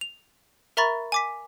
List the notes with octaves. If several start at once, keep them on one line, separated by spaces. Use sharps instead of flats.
F7
A#4 E5 A#5 B5 C#6 A6
G#5 D6 B6